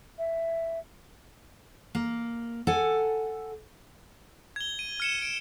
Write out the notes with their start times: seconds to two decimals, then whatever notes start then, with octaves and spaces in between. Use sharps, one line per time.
0.18 E5
1.95 A#3
2.67 A4 F#5 G#5
4.56 G#6 G7
4.79 D#7
5.00 F6 C#7 E7
5.22 D7